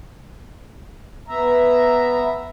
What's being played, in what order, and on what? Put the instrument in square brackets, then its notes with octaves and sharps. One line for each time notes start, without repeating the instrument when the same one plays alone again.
[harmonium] B3 E5 A#5